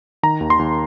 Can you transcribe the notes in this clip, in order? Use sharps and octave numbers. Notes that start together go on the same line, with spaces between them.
D#3 A#5
D#2
C6
D#2